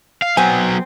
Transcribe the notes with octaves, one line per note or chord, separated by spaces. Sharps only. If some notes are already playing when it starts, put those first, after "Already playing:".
F5
F#3 B3 C4 G#5